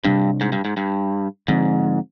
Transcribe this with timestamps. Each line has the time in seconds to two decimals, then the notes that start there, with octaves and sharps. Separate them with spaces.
0.05 G2 C3 G3 D4
0.41 G#2
0.52 G2
0.65 G#2
0.77 G2
1.48 G#2 D3 F3 C4